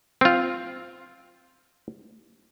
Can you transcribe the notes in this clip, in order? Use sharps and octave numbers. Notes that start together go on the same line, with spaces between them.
C4 F4